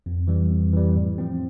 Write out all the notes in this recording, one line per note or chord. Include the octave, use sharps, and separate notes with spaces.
F2
E3 G3
F2
E3 G3
A2
F3 C4